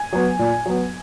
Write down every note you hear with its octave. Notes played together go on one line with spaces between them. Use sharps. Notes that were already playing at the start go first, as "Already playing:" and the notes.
Already playing: G#5
F#3 B3
A#2
F#3 B3